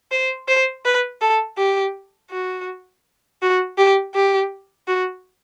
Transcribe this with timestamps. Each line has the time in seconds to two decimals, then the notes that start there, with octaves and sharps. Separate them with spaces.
0.11 C5
0.48 C5
0.85 B4
1.21 A4
1.58 G4
2.31 F#4
3.42 F#4
3.78 G4
4.15 G4
4.88 F#4